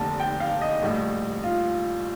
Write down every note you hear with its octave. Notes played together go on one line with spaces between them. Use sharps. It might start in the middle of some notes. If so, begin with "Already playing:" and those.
Already playing: F1 D#2 D3 A5
G5
F5
D#5
A#1 A2 G3
F4